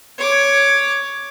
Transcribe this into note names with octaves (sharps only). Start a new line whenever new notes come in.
C#5 D6